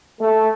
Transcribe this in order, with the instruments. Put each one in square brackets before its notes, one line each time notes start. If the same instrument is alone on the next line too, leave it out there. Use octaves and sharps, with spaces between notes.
[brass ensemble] A3